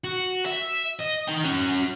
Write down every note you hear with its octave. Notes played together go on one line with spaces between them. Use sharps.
F#4
E5
D#5
D#4 G5
C#4 F#4